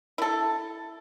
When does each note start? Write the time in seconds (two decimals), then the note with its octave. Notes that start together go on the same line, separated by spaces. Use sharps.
0.18 E4 A4